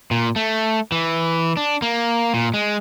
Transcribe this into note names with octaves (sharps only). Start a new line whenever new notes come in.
A#2
A3
E3
D4
A#3
A#2
G#3